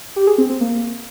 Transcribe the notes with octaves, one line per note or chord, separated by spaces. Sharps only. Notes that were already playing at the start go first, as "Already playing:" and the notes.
G4
G#4
C4
C4
A#3